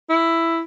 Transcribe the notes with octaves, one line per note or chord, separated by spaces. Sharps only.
E4